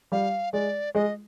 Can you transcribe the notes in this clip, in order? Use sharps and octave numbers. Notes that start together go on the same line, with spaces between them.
G3 F5
G#3 D5
G#3 D#5